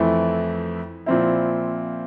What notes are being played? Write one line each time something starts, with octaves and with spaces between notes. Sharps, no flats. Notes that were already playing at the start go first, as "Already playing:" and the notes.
Already playing: F2 E3 A3 C4 E4
A#2 F3 C4 E4